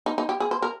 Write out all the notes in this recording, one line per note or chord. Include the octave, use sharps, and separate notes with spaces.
D#4
D#4
G4
G#4
C5
A#4